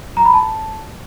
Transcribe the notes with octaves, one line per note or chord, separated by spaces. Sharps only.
A#5
B5
A5